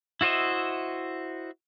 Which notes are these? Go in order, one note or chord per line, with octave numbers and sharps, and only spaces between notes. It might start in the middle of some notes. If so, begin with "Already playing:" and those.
E4 F#4 C5 D#5 E5